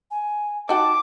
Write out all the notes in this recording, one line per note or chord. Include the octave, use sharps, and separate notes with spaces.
G#5
D#4 F#4 G5 A5 D6